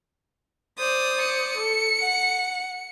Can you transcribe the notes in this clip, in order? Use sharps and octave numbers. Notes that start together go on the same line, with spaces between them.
C5 D5 D#6
C#7
A4
F#5